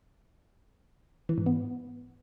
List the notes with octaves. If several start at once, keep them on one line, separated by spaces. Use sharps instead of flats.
E3
G#2
B3